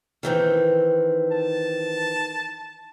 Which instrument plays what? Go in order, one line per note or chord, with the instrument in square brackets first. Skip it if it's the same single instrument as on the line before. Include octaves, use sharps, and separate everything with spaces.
[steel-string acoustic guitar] D#3 E3 C4
[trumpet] A5